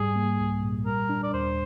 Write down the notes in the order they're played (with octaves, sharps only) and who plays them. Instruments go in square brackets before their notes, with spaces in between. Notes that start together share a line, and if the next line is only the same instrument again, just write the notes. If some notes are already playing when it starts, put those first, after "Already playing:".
Already playing: [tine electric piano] G#2 G3 [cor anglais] G#4
[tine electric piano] A#3
C2
A#2
[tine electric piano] G3 [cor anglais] A#4
[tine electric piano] D4
[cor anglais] D5
[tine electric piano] D#2 [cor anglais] C5